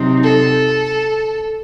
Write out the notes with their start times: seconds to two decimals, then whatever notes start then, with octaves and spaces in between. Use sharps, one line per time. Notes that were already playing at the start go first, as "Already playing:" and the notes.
Already playing: C3 F#3 C4 D#4
0.23 A4